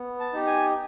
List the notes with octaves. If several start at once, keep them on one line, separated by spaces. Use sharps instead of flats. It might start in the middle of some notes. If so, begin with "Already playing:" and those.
Already playing: B3
A5
D#4 G4
G#5